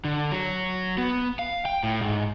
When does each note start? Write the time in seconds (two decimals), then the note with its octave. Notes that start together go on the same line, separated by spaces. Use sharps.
0.05 D3
0.31 F#3
0.98 B3
1.39 F5
1.65 G5
1.83 A2
2.01 G#2